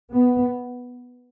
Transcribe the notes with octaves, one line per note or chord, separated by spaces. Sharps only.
B3